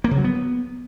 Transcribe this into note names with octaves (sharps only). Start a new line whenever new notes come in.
A#3
C#3
F#3
B3